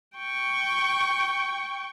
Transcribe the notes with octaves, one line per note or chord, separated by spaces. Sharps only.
G5 C#6